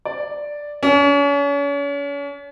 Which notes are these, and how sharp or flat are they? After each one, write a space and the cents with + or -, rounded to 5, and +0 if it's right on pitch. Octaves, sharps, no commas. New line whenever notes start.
D5 +0
C#4 +40